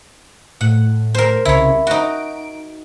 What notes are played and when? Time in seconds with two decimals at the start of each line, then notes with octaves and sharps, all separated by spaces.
0.61 A2 F#5
1.15 A#4 C5
1.45 C2 C#3 E4 C#5
1.87 D#4 F#4 D7